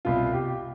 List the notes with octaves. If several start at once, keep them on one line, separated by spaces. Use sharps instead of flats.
C2 B2 F4
G4
G4